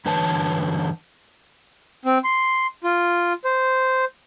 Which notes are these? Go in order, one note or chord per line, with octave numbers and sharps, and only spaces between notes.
G2 D3 E3 B4 C#5 A5
C4
C6
F4
C5